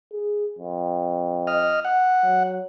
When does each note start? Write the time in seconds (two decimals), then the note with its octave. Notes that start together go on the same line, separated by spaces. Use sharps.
0.13 G#4
0.58 F2
1.47 D#5 F6
1.85 F#5
2.24 F#3